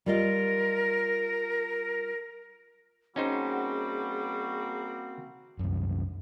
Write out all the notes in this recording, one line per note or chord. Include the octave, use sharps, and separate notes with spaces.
G3 F4 A#4 D#5
G3 A#3 C4 C#4 D#4 F#4 G#4 C5
C2 F#2